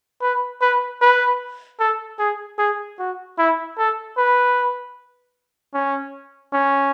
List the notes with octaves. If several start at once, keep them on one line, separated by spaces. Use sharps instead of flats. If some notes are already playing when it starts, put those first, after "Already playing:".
B4
B4
B4
A4
G#4
G#4
F#4
E4
A4
B4
C#4
C#4